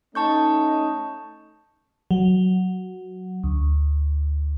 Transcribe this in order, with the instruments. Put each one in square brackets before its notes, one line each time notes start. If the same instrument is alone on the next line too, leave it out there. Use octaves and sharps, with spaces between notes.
[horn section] A3 C#4 D#4 [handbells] A5 C#6 G6
[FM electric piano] F#3
D2